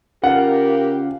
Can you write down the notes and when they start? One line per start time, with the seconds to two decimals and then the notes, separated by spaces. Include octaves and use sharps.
0.24 C#3 F4 G4 A#4 F#5